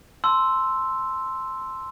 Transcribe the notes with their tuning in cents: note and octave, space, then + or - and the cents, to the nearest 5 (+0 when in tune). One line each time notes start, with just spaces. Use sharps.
A5 +0 C6 +0 E6 +0